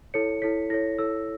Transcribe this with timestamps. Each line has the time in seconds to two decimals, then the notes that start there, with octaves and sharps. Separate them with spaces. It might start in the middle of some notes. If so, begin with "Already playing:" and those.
0.14 E4 A4 C#5 C#7
0.42 E4 A4 C#5 B6
0.70 E4 A4 C#5 A#6
0.99 E4 A4 C#5 E6